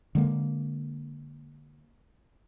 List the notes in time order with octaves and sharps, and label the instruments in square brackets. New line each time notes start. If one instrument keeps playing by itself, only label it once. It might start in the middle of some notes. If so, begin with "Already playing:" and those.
[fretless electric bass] D3 G#3 A#3